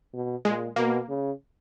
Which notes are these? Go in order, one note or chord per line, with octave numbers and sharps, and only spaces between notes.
B2
A#2 G#3
B2 A#3
C#3